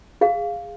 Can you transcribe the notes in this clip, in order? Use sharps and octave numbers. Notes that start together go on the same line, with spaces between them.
G#4 F5